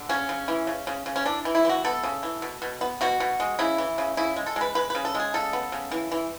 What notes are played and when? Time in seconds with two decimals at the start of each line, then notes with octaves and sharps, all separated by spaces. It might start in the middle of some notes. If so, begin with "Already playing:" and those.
Already playing: D3
0.09 C#3 C#4
0.29 C#3
0.48 E3
0.67 C#3
0.87 C#3
1.06 C#3
1.16 C#4
1.26 E3 D4
1.45 E3
1.55 E4
1.65 E3 F#4
1.85 B3 A4
2.03 C#3
2.23 E3
2.42 B2
2.62 B2
2.81 B3
3.01 B2 F#4
3.20 B2
3.40 G#3
3.59 C#3 E4
3.78 E3
3.98 C#3
4.17 C#3 E4
4.36 G#3
4.46 A4
4.56 G#3 B4
4.75 G#3 B4
4.90 C#3 B4
5.05 A4
5.15 G#3 G#4
5.34 C#3 A4
5.53 B3
5.72 C#3
5.92 E3
6.12 E3